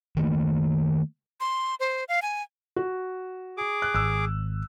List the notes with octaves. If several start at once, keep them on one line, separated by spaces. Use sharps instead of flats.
D#3 A3 A#3
C6
C5
F5
G#5
F#4
G#4 D6
F#6
G#1 E6 F#6